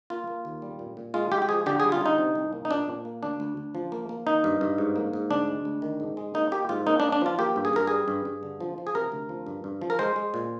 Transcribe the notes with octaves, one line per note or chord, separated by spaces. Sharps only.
A#3 F4
A#3
D#2
G3
A#2
A#2
G#3 F4
G#3 G4
G4
F3 G#4
D3 G4
G#4
G3
F4
D3 D#4
C3
C2
A#3
D#4
A#2 D4
A#2
A#3
D2 D4
D2
D2
F3
A#3
A#3
D#3 D#4
G2
G2
G#2
A#3
G#2
D2 D4
G#3
D2
D#3
G#2
G#3
A#3 D#4
A#3 G4
G#2 F4
A#3 D#4
D4
A#3
D4
F3 F4
A#3 G4
G2
G#4
G2 A#4
G3 G#4
G2
G2
D3
F3
F3
G#4
C3 A#4
D2
F3
G2
G2
F3
A#4
G#3 C5
G#3
A#2